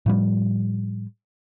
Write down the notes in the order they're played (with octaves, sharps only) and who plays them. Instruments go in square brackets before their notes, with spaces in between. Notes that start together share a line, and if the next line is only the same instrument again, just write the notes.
[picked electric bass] A2 F3 G3